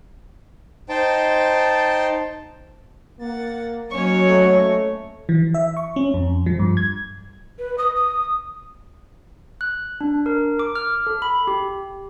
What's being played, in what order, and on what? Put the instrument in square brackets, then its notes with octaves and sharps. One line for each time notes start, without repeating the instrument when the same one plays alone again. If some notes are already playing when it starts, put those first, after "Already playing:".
[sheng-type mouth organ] D#4 C5 G5 A5
[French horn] A#3 [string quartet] F#5 A6
[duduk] F#3 [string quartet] A#3 C#4 D#5 [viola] C#5 C#6
[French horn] A3
[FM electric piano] E3
E5
C#6
C#4
F2
F3
G2
G#6
[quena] B4
D#6
D#6
[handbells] F#6
D4
A#4
D6
F6
A4
B5
G4